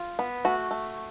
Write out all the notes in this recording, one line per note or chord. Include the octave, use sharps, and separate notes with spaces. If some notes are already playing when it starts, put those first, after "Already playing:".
Already playing: F4
B3
A3 F#4
A3